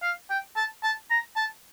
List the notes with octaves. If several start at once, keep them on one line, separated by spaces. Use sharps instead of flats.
F5
G5
A5
A5
A#5
A5